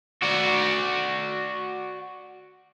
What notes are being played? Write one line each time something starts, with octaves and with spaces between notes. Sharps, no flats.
F#4 D5